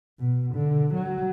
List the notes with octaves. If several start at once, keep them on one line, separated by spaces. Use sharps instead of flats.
B2
D3
F#3